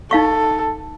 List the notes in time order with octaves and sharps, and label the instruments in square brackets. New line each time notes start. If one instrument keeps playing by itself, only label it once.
[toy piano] D#4 F5 C#6 [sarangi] A4